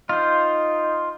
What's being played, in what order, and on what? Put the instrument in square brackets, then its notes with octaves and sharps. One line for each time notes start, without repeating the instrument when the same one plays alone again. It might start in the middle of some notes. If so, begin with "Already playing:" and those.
[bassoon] D#4 [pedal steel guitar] F4 C5